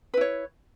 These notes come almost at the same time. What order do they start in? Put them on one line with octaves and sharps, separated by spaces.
B4 E4 C#5